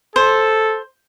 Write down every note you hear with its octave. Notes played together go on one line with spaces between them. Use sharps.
A4 C5